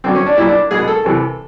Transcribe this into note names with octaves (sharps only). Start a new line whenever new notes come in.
G2 D3 F#3 C4
C#4
D4
B1 A#2 G3 E4
D4
C#2 B2 F#3 G#4
A4
C2 C3 E3